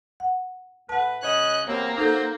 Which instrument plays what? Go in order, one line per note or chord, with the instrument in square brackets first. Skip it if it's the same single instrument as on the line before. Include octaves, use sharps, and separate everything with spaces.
[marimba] F#5
[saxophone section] A2 B4 [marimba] F#5 A5
[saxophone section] C#3 C#5 D#5 [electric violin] F#6
[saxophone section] E2 C4 [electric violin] A#3 [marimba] G4 C#5
[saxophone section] F#3 C5 [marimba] D#4 A4